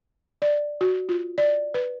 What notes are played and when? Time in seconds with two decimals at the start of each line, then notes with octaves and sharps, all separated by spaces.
0.42 D5
0.81 F#4
1.09 F4
1.38 D5
1.74 B4